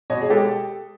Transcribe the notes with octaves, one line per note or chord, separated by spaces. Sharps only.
B2 C#5 D#5
G#4
G#3 G4 A4